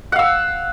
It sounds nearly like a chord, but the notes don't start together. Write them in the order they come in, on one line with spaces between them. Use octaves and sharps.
F#5 F5 E6